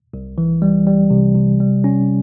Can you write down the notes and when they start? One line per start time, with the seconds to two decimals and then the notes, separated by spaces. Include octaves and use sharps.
0.14 C2
0.38 E3
0.62 G3
0.87 G3
1.10 C3
1.35 C3
1.60 G3
1.84 C#4